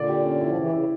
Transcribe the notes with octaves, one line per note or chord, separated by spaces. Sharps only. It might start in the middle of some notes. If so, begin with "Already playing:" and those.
Already playing: A#2 D3 D5
G4
C#4
E4
F3
C#3 E3 E4
C#3 E4